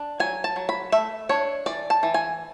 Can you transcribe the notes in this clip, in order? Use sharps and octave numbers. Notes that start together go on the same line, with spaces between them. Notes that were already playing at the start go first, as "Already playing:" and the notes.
Already playing: D4
F#3 G#5
A5
F#3
B5
A3 E5
D4 C#5
E3 D5
A5
E3
G#5